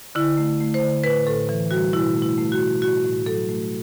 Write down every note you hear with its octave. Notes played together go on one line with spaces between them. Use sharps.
D3 E4
A3
A3
C5
D3
A2 B4
A2 A4
E3
G3 F#4
B2 E4
A3
E4
A3
F#4
B2
A2 F#4
A2
F#3 A4
A3